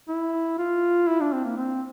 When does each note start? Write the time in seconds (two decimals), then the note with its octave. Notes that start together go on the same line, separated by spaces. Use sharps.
0.08 E4
0.58 F4
1.08 E4
1.20 D4
1.33 C4
1.45 A#3
1.57 C4